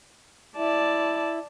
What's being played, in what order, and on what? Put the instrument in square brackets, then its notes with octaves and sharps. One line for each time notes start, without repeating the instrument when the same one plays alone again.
[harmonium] E4 [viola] D5 A5